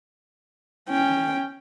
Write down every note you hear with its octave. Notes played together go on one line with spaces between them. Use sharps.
C#4 G5